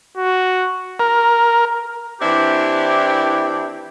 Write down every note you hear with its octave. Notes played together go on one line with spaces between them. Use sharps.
F#4
A#4
E3 C4 D4 E4 G4